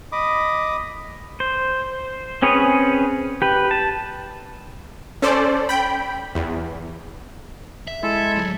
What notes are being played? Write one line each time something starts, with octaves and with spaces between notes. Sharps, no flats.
D#5 B5 D6 D#6
C5
C4 C#4 G#4 B4 C#5
G4 B4
A5
C#4 A4 C5 D5
G5 B5
E2
E5
G#3 E4 A4
A2 F#3